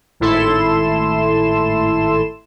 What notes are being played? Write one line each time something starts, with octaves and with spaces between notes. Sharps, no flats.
G#1 A2 E4 A4 C6 E7